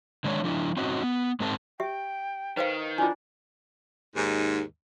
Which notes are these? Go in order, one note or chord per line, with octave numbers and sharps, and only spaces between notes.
D3 D#3 G#3 D4 G#4 C#5
F3 D4 E4
C4 C#4 D#4 F#4
B3
G#2 G#3 C4 A#4 C5 A5
G4 E5 G5
D#3 B4 C5 F5
D4 E4 F4 G#5
D#2 G#2